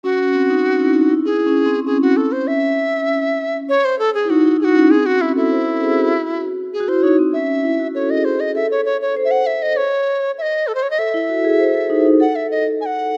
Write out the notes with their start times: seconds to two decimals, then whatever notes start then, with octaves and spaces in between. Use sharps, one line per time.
0.04 C#4 F#4
0.19 C#4
0.35 C4
0.50 D#4
0.65 C#4
0.80 E4
0.96 D#4
1.10 E4
1.25 E4 G#4
1.46 C#4
1.66 C4
1.86 C#4 G#4
2.02 F#4
2.17 A4
2.32 C5
2.47 E5
3.69 C#5
3.85 C5
3.99 A4
4.14 G#4
4.25 E4
4.30 D#4 F#4
4.45 E4
4.60 D#4 G#4
4.64 F#4
4.76 C#4
4.91 C4 G#4
5.06 C#4 F#4
5.21 E4 F#4
5.36 E4 A4
5.51 C5
5.67 A4
5.82 G#4
5.97 F#4
6.73 G#4
6.80 F#4
6.88 E4 C5
7.03 D#4 C#5
7.19 C4
7.33 C#4 E5
7.64 E4
7.80 F#4
7.95 A4 C#5
8.10 G#4 D#5
8.25 C5
8.35 G#4
8.40 D#5
8.55 A4 E5
8.71 C#5
8.85 C#5
9.01 C#5
9.17 C5
9.25 E5
9.31 F#5
9.46 E5
9.62 D#5
9.77 C#5
10.38 E5
10.42 D#5
10.67 A4
10.75 C5
10.83 C#5
10.90 D#5
10.99 A4 E5
11.14 E4
11.29 F#4
11.45 G#4
11.60 C5
11.75 A4
11.90 D#4
12.05 D#4
12.20 A4 F#5
12.36 E5
12.51 D#5
12.81 G#5
12.86 F#5